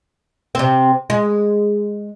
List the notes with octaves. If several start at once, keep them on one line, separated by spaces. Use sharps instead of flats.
C3 C4
G#3